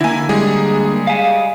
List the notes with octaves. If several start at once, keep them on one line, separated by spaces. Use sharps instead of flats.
D3 A#3 E4 G#5
G3 G#3 G#4
F5 G#5